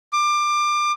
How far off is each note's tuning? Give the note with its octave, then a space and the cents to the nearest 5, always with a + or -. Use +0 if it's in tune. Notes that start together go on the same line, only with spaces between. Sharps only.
D6 +25